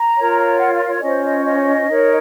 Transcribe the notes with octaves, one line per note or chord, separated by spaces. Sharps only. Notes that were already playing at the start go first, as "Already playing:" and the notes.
Already playing: A#5
F4 A#4 C#5
F#5
F5
C#5
C#4 F4 C5 D#5
D#5
D#5
D#4 A#4 C#5